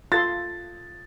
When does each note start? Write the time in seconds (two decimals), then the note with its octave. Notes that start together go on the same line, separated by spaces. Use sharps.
0.12 F4 A4 C6 A6